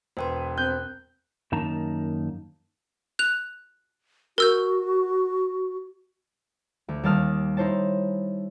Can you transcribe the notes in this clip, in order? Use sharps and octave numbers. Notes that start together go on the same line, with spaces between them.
E1 B4 C5 G5 C6
C4 F#6 G6
F#2 D#3 A#3 D#4 A5 A#5
F#6 F7
F#4 A#4 E6 G6
D2
D#2 G3 A5 D#6 F6
D#4 E4 C5 C#5 A5